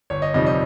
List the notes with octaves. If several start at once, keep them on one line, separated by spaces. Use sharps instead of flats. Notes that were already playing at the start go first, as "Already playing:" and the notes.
G1 C#5
D#5
F2 C3 D#3 G3 D#5
D#5